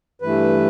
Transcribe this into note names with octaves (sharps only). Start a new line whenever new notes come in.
G2 E3 A3 B4